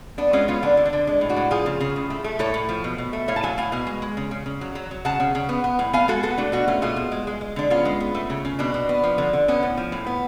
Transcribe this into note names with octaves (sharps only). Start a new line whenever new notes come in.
B3 D4
G#3 C#4 F4
B3 C#4 F4
D3 D4
D3
D4
D3
G#3 D4
A2
D4 F#4
A2
F3 F4 G#4
C#3
C#3
A2
A3
A3
A2 A4 C#5
A2
F3
B2
B2
A3
A2 C#5 F5
A5
F#3 F5 G#5
A2 F5 G#5
B2 F5 G#5
G#3
G#3
C#3
C#3
C#3
F#3
F#3
F#3
C#3 F#5 A5
C#3
C#3
B3
B3
A2
B3 F5 G#5
G#3 F#4 A4
B3 F#4 A4
A3 D4 F#4
B2 D4 F#4
A3 C#4 F4
B2 F4 G#4
B2
G#3
G#3
G#3
D3 D4
B3 C#4 F4
G#3
B3
A3
C#3
C#3
B2 D4
B2
B3
F3
D3
D3
B3 C#4
A2
F3
A2
B3